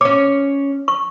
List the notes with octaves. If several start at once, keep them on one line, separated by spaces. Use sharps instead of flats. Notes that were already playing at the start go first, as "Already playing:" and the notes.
C#4 C#5 D6
C#6